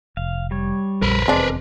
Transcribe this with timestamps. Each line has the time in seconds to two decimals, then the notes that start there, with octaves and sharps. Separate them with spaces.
0.17 F1 F5
0.51 G3 C#5
1.02 A#1 F2 A#4 B4
1.28 F1 E2 G#3 C4 D4